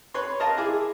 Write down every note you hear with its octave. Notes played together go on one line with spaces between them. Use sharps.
B4 C#5 C6
A#4 D#5 F5 A5
E4 G#4 D6